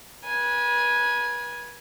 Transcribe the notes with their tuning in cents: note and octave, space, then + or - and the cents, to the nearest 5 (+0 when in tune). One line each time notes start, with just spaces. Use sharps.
B4 -35 G#5 +0